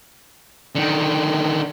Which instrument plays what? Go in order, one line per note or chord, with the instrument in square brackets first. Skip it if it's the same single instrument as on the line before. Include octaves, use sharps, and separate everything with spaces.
[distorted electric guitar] D3 D#3